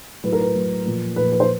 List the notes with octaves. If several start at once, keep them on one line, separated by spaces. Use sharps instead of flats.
A2 F#3 B4
A#4
B4
A2 F#3
A#2 F3
A#2 F3 B4
B4
C5